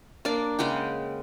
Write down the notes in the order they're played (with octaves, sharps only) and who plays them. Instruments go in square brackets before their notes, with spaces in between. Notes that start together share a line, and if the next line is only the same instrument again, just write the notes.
[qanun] A#3 D4 D5
C#3 G#3 F#5 G5